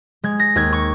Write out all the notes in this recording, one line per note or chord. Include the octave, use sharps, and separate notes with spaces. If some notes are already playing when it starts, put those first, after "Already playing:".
G#3 G#6
A#6
D#2 G#6
C#6